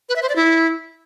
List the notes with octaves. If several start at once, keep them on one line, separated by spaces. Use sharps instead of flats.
B4
E5
C5
D5
E4